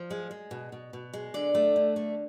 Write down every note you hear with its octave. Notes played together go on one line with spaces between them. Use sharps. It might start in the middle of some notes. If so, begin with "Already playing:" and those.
Already playing: F3
G#3
G#3
B2
B2
B2
G#3
D3 D5
A3
D3
A3